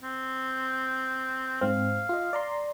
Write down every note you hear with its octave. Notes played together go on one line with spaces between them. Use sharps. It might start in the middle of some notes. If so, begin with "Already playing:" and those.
C4
G#2 C4 F5
F4 D#5
D5 A#5 C6